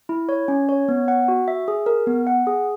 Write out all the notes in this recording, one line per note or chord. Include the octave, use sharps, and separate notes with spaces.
E4
C#5
C#4
C#5
B3
F#5
F#4
E5
G#4
A#4
B3
F#5
G#4